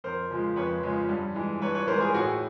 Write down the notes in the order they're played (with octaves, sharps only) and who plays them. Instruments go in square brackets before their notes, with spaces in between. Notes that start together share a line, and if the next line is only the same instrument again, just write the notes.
[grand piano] F2 A#4 C5
C#3 F3 G#3
F2 B4 C#5
C#3 F3 G#3
G2
E3 G#3
G2 B4 C#5
B4 C#5
E3 G#3 A#4 C5
G#4 A#4
A2 F#4 G#4